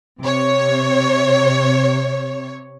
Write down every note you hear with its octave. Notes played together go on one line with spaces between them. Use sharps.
C3 C#5